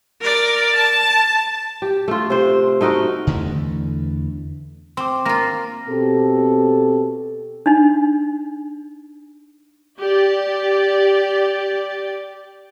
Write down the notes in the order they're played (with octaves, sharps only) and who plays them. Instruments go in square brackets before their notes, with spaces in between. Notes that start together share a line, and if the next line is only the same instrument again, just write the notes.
[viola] A#4 D5
A5
[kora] G4
A3 F4
C3 C5
A3 D#4 F#4 A#4
[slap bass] E2 D3 E3 A3
[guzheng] C4 [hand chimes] C6 D6
[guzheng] A#3 F4 [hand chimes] A#6
[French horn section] B2 C4 G4 A4
[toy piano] D4 D#4
[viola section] G4 D5